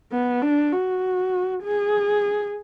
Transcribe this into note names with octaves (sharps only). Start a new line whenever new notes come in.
B3
D4
F#4
G#4